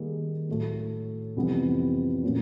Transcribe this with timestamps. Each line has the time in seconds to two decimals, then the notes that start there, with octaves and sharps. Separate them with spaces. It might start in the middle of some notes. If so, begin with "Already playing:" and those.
Already playing: D#3 G3 A#3 D#4 G#4
0.49 A2 F#3 A3
1.36 F2 C3 E3 G3 B3
2.24 A#2 F#3 A3 C#4